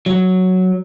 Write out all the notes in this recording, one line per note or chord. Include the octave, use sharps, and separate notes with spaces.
F#3